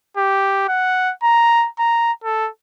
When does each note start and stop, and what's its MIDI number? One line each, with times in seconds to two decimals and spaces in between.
0.17 0.64 67
0.68 1.12 78
1.23 1.67 82
1.79 2.12 82
2.24 2.49 69